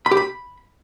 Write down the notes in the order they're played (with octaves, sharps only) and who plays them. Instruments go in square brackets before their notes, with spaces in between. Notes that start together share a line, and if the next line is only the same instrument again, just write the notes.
[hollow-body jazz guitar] B5
G4
B5